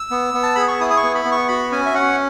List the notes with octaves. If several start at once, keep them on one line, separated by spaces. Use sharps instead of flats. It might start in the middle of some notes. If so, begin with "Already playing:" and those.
Already playing: E6
B3
B3
A5
G#4 B5
C#6
E4 D#6
D#6
C#6
B3
B5
B3
C#6
F#4 B5
C#4 G#5
E5
C#4 F#5